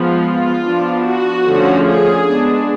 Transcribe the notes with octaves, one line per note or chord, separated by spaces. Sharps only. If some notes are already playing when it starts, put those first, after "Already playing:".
Already playing: F3 G#3 B3
F4
F3 B3 D4
F#4
D3 F3 A3 C#4
G#4
G#3 B3 D4